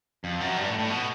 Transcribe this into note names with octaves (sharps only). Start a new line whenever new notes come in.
F2
F#2
G2
A2
A2
B2